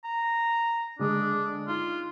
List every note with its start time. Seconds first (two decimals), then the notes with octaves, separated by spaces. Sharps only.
0.04 A#5
0.99 D3 G#3 D4 D#6
1.68 D#4 F4